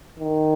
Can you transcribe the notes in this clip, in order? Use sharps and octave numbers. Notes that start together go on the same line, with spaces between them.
D#3